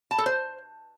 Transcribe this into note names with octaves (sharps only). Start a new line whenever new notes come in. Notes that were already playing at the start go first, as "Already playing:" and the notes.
A5
A4
C5